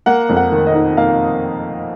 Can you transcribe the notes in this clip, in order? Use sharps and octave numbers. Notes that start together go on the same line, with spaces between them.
A#3 F#5
F2
F#5
D#3
D#5
D#4
A#3 F5